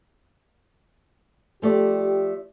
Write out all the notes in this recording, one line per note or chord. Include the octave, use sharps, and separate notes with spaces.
F3 A3 G4 D5